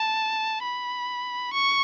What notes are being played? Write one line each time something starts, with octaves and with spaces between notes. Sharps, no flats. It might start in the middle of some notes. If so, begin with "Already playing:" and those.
Already playing: A5
B5
C#6